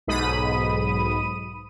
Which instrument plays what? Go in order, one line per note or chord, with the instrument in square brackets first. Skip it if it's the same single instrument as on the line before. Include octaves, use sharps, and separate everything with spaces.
[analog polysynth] B1 G#2 B5 D#6 D#7